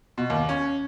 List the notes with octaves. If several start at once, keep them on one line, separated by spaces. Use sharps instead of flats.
B2
D#2
C#4